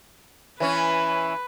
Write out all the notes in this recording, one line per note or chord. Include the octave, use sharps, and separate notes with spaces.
E3 C#4 B4